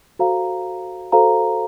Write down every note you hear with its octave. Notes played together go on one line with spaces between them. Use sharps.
F#4 A4 C5 F5 A#5
F#4 A4 C5 F5 A#5